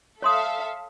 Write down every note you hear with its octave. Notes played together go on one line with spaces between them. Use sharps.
A4 C#5 E5 F5 C6 D#6